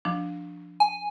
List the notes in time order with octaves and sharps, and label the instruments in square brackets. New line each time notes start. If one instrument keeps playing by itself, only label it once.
[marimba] F3 D4
[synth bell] G#5